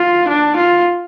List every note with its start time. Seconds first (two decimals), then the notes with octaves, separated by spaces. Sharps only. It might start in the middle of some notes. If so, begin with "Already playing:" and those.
Already playing: F4
0.28 D4
0.56 F4